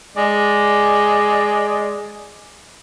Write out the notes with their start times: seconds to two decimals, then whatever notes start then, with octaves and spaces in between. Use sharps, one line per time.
0.17 G#3 D5